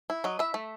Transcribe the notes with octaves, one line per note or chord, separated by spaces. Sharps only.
E4
F#3 D#5
E4 E5
A3